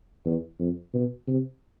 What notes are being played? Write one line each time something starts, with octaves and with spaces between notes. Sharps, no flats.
E2
F2
B2
C3